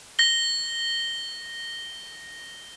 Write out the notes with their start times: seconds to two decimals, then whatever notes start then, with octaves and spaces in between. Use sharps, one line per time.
0.19 A#6 G7